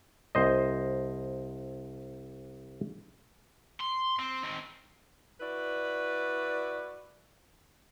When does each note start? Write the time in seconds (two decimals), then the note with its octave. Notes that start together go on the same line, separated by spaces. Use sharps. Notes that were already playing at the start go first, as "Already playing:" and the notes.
0.35 C2 C5 D#5
3.80 C6
4.19 C4
4.43 D#3 C4
5.40 E4 F#4 B4 D5